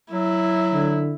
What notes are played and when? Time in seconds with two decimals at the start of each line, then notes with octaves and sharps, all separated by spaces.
0.11 F#3 E4
0.74 D3